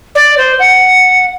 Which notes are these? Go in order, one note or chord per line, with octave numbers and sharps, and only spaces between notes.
D5
C5
F#5